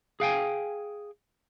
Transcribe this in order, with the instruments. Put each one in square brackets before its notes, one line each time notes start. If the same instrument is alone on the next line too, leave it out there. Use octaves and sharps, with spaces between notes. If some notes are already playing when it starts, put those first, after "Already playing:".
[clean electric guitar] G#4 F5 G5 G#5